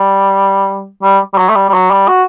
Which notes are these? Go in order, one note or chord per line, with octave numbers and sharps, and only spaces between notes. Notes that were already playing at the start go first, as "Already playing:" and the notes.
Already playing: G3
G3
G3
F#3
A3
G3
G3
F#3
G3
F#4